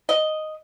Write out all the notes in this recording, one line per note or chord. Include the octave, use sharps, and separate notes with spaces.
D#5